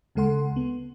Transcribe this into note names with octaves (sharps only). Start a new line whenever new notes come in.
D2 C#3 G#3 A4 F#5 C6
B3